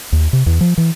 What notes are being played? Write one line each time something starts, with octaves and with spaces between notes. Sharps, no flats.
D#2
C3
E2
F3
E3